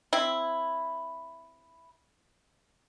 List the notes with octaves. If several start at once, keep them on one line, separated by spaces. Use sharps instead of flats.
C4 E4